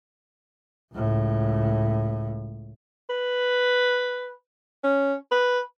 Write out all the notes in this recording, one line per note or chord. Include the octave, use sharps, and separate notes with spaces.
C#2 A2
B4
C#4
B4